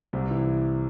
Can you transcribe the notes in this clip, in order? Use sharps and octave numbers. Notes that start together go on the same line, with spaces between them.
C2 C3 C4
E3 E4